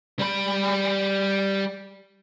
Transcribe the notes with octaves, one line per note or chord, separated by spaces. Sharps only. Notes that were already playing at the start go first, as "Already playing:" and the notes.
G3 B5